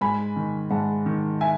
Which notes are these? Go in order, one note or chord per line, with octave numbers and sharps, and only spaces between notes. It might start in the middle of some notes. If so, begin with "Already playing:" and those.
G#2 G#5 B5
D#3
G#2 F#5 A5
D#3
E5 G#5